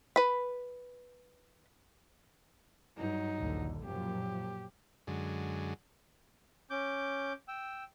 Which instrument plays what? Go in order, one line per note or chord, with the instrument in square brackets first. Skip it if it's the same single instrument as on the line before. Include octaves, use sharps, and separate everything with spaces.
[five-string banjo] B4 B5
[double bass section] G2 [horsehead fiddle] F#3 D#4
[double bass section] A#1 D#2 D3
[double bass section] F#2 A#2 F3 [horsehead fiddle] G4
[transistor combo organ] F#2 D3 G#3
[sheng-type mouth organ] C#4 D6 G6
G5 E6